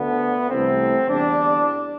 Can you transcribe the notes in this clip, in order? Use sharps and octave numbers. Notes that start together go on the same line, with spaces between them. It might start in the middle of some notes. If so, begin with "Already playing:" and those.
Already playing: D2 D3 A3 B3
C2 C3 E3 A3 C4
E2 D3 G3 D4